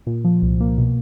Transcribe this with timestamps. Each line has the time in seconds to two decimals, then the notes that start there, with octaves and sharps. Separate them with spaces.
0.07 A#2
0.24 F3
0.42 C2
0.60 A#3
0.78 B2